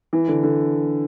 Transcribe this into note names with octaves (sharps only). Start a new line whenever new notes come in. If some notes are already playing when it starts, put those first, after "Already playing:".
E3
D3
D3